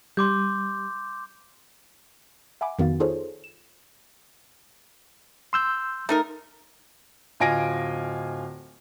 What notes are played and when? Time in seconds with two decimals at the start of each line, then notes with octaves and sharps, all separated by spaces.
0.17 G3 C6 D6 G6
2.61 E5 F#5 G#5 B5 D6
2.79 F2 D#3 B3 F#4 F5 A6
3.00 D#4 F4 G#4 A4 C5 C#5
3.44 E7
5.53 C6 E6 G6
6.09 A3 D#4 A#4
7.40 D1 F4 D#5 G#5 A#6 D7